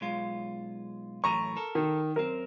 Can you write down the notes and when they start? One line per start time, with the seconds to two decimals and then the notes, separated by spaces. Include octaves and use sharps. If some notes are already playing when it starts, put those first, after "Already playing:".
0.01 B1 G#3 F4
1.24 F#2 A2 E3 A#5 C#6
1.57 A4 A#4
1.75 D#3
2.16 F#2 C4 A#4